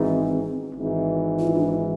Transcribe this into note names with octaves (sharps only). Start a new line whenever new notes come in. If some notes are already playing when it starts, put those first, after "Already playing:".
Already playing: G#1 G#2 E3 C4
G#1 G#2 E3
F4
E4
D4